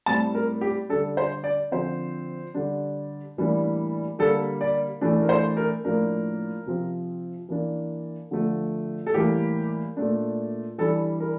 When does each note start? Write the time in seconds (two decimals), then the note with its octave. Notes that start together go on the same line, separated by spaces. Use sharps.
0.06 A2 G3 C4 A5
0.35 A#4
0.61 G4
0.89 D3 G3 D4 A4
1.17 C5
1.44 D5
1.71 D3 F3 C4 C5
2.54 D3 G3 D4
3.37 A2 E3 G3 A#3 D4
4.19 D3 G3 A#3 D4 A4
4.61 D5
5.01 A2 E3 A3 D4
5.22 A#4
5.29 C5
5.57 A#4
5.84 A2 F3 A#3 D4 A#4
6.66 C3 F3 C4
7.49 E3 A#3 D4
8.31 D3 F3 A3
9.06 A4
9.14 A2 E3 G3 A#3 G4
9.97 A#2 A3 D4
10.78 E3 G3 D4 A4
11.20 A#4